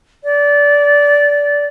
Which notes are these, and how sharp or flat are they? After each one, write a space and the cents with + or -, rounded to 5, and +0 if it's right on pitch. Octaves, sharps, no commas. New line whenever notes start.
D5 -20